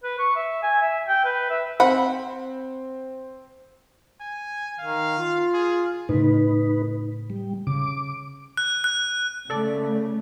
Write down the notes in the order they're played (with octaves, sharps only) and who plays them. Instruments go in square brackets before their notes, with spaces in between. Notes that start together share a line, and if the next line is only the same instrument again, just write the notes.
[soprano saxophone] B4
C#6
E5
G#5
E5
G5
B4
E5
[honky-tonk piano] C4 [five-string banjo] F#5 B5
[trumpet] G#5
[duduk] D#3 [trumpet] F5
[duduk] F4
[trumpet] G#4
[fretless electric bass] A2 C#3 [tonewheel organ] D#4 B4
[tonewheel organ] G3
[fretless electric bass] C#3 [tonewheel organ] D6
[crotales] F#6
F#6
[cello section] C#3 A3 [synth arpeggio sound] A4 D5